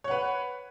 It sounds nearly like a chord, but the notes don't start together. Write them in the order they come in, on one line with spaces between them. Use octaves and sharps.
C#5 F#5 B4